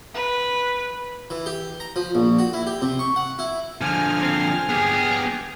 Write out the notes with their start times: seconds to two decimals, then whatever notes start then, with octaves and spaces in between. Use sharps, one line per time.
0.15 B4
1.30 E3
1.46 G4
1.80 A#5
1.96 F3
2.15 A#1
2.39 F#4
2.53 E4
2.67 G4
2.82 C3
2.99 C#6
3.16 F#5
3.39 E4
3.81 D3 F3 G#5 F6
4.22 C4
4.69 B3 G4 G#4